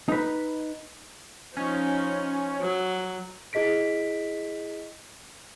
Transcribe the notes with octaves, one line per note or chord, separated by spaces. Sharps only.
D#4 B4
F3 C#4 D#4
F#3
E4 G#4 D#5 B6 D7